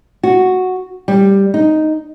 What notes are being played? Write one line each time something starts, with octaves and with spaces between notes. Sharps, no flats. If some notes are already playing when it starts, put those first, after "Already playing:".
F#4
G3
D#4